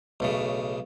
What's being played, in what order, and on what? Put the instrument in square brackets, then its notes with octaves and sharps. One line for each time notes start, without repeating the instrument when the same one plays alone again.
[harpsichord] B1 A2 C#3